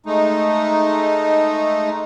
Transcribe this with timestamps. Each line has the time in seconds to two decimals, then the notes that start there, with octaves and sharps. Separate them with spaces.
0.06 G#3 A3 D#4